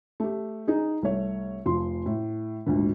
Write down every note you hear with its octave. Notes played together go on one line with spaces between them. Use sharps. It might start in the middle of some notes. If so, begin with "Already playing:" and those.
A3 G4
D#4 G#4
C2 A3 C#5
F1 F3 C6
A2
G#1 D2 A#2 D3